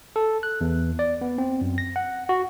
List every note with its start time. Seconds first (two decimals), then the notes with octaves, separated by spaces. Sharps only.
0.16 A4
0.43 F#6
0.61 E2
0.99 D5
1.21 B3
1.38 C4
1.61 F#2
1.78 A#6
1.96 F#5
2.29 F#4